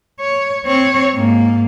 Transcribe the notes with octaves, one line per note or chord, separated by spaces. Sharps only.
C#5
C4 C#5
G#2 A#3